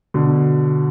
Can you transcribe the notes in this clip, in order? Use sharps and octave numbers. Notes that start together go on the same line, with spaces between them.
B2 D3